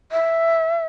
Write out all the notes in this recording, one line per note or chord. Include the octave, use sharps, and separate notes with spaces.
E5